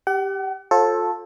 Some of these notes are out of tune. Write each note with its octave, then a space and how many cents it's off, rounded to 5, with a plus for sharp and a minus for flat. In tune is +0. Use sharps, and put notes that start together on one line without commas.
G4 +0 F#5 +40
F4 +30 A4 +0 C5 +45